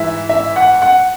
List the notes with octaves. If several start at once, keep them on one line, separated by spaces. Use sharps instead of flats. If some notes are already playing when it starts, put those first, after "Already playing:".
Already playing: G#2 E3 E5
E5
F#5
F#5